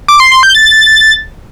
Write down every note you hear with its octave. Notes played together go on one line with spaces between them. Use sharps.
D6
C6
C6
G6
A6